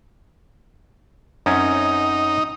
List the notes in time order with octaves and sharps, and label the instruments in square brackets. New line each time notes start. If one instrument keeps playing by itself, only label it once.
[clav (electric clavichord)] F#2 C4 C#4 [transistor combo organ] D#4